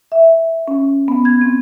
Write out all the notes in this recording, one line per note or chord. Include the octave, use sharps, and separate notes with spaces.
E5
C#4
B3
G#6
C4